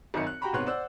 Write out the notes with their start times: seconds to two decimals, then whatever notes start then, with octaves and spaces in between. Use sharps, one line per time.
0.14 G#1 F#2 D#4 A#4 E5 C#7
0.27 F#6
0.41 F#4 G4 G5 A#5 B5 C#6
0.53 G#2 C3 B3 C#5 C6 F#6
0.66 C5 D5 F#5 E6 F#6